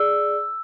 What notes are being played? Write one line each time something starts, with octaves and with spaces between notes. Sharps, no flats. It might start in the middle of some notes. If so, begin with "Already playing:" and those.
Already playing: G#4 D5 E6